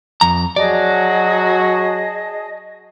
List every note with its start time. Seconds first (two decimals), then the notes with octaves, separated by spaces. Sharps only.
0.21 F2 A#5
0.56 F#3 F#4 G#4 D5 D#5 A5